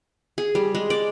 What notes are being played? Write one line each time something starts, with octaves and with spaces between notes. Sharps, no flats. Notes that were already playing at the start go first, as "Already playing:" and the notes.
G#4
G3
G#3
D5